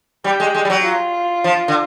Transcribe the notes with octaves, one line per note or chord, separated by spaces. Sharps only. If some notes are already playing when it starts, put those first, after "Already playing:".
G3 G4
G#3
G#3
G3
F#3
F4
F3
D3